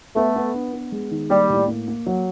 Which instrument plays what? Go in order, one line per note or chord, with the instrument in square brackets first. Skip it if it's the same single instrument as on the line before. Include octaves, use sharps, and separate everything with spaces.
[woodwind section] A3 [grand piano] B3
[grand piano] B3
D4
B3
G#3
D#3
[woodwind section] G3 [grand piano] A#3
[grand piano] A2
A#3
A#3
F#3